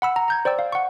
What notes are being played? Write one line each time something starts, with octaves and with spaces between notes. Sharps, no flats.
F#5 B5 E6
A#5
A#5 G6 G#6
C5 D5 G5 E6
F5
F#5 C#6